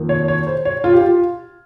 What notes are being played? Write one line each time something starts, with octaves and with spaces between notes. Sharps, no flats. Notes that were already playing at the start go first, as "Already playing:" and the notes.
Already playing: F2 D#3 A#3
C#5
C#5
C5
C#5
F4
G4
F4